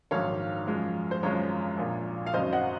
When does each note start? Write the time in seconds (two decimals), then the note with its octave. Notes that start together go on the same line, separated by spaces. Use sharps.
0.11 A#1 G#2 D#3 F#3 C#5 F5
0.67 F#2 F3 G#3
1.11 C5
1.23 G#1 F#2 F3 G#3 C#5
1.77 A#1 A#2 F3
2.26 F5
2.33 G#1 F#2 C#3 F#3 C5 D#5
2.53 D#5 F#5